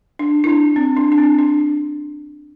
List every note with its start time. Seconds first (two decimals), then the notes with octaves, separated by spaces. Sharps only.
0.19 D4
0.44 E4
0.47 D4
0.76 C4
0.97 D4
1.12 D4
1.18 C4
1.39 D4